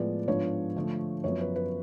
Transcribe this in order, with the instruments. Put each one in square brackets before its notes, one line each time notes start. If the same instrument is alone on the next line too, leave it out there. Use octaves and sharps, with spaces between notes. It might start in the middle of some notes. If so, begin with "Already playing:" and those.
Already playing: [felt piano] A2 F3 G#3 B3 F4 D5
G#2 F3 B3 D4 F4 C#5
D3 F3 A3
F#2 F3 B3 C#5
B4
B4